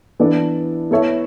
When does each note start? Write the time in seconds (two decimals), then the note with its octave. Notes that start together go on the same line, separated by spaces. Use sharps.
0.20 E3 B3 D4 A4 D5
0.91 B3 E4 A4 C#5 E5